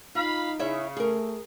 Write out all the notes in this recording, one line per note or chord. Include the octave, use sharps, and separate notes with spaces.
D#4 F4 F5 B5
C#3 E4 C#5 E5
A3 G#4 A#4